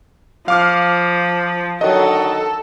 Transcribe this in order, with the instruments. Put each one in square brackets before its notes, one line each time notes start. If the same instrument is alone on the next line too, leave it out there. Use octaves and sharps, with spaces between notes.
[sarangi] F3 [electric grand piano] F5 D6 F6
[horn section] D3 D#3 F#3 [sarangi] A4 [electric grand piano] D#5